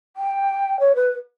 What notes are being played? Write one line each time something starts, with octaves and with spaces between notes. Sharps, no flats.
G5
C#5
B4